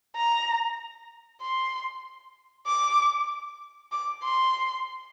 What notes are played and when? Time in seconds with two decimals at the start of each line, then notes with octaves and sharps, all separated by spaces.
0.16 A#5
1.41 C6
2.67 D6
3.92 D6
4.23 C6